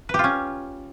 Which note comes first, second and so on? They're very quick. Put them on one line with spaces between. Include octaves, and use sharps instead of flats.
B4 G4 F4 C#4